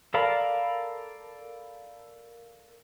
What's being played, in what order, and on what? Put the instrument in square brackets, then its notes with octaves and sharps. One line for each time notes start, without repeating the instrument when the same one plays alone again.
[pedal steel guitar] A4 A#4 D5 F5 B5